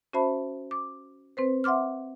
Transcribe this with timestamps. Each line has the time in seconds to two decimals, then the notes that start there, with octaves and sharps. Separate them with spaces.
0.13 C#4 F#4 C5 E5 A5 B5
0.71 D6
1.37 C4 B4 C5
1.64 E5 F#5 C6 D6 F6